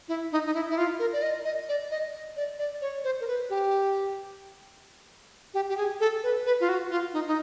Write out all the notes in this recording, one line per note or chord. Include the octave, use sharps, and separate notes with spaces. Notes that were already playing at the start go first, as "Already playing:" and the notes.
E4
D#4
D#4
E4
E4
F4
A#4
D5
D#5
D#5
D5
D#5
D5
D5
C#5
C5
A#4
B4
G4
G4
G4
G#4
A4
B4
B4
F4
F#4
F4
D#4
D#4